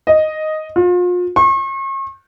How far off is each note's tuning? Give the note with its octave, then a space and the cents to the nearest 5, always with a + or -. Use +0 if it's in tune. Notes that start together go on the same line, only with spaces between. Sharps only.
D#5 +0
F4 +35
C#6 -40